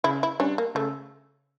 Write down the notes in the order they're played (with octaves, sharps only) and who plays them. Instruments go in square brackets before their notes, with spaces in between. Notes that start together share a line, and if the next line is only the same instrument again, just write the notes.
[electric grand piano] C#3 [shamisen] E4
[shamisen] E4
[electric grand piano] G3 D4 [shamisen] C#4
[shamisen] A#3
[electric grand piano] C#3 [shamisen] A3